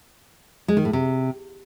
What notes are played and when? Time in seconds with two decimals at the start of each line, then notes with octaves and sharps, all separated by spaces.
0.68 G#3
0.77 D#3
0.85 A2
0.93 C3